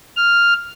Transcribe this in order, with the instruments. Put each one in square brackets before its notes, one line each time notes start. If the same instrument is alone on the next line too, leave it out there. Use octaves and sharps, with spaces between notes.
[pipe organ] F6